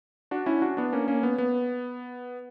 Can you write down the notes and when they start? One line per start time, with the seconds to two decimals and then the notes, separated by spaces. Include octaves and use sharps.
0.31 D4 F#4
0.46 C#4 E4
0.62 D4 F#4
0.77 B3 D4
0.93 A#3 C#4
1.08 A#3 C#4
1.23 B3
1.38 B3